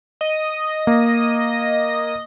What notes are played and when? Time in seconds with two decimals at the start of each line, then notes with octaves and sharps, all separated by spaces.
0.21 D#5
0.87 A#3